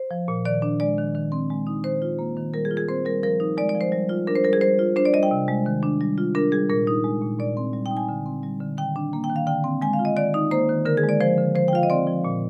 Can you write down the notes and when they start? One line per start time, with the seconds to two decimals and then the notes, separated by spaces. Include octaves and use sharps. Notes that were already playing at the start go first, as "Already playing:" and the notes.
Already playing: C5
0.11 F3
0.28 A#2
0.45 D#3 D5
0.62 D4
0.80 G#3 D5
0.98 D#3
1.15 D#3
1.32 C4
1.50 G#3
1.67 D#4
1.84 D#3 C5
2.02 F4
2.19 A#3
2.37 D#3
2.54 G3 A#4
2.65 G#4
2.71 F4
2.77 G#4
2.88 C4 C5
3.05 G3 A#4
3.23 F3 A#4
3.40 D#4
3.57 G#3 D5
3.69 D5
3.75 F3
3.81 C5
3.92 G3
4.09 F4
4.27 D4 A#4
4.35 C5
4.44 G3 A#4
4.53 G#4
4.61 G3 C5
4.79 F4
4.96 D4 C5
5.05 D5
5.14 G3 D#5
5.23 G5
5.31 C3
5.48 G#3
5.66 D#3
5.83 D4
6.01 G3
6.18 F4
6.35 D4 A#4
6.52 G3 G#4
6.69 A#2 A#4
6.87 D#4
7.04 G#3
7.22 A#2
7.39 A#2 D5
7.57 C4
7.73 G3
7.86 G5
7.91 D#4
7.97 G#5
8.09 D3
8.26 C4
8.43 G3
8.60 D3
8.78 D#3 G5
8.96 D4
9.13 A#3
9.24 G5
9.30 D#3
9.36 F5
9.47 D3 G5
9.64 C4
9.82 G#3 G#5
9.93 F5
9.99 F4
10.05 D#5
10.17 D#3 D5
10.34 D#4
10.51 A#3 C5
10.69 D#3
10.85 D3 A#4
10.97 G#4
11.03 G#3
11.09 D5
11.20 F3 C5
11.38 D3
11.55 F3 C5
11.68 G5
11.73 F4 F5
11.83 D#5
11.90 C4 D5
12.07 F3
12.24 A#2